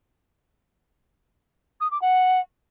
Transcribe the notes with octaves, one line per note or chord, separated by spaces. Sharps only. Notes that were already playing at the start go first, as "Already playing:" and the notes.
D#6
D6
F#5